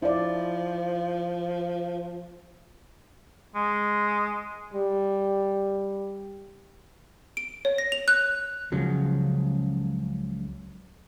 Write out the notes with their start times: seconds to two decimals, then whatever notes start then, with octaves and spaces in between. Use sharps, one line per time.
0.02 F3 E4 D5
3.55 G#3
4.74 G3
7.37 D7
7.65 C#5
7.78 A#6
7.92 F7
8.08 F#6
8.72 C#2 C#3 F3 F#3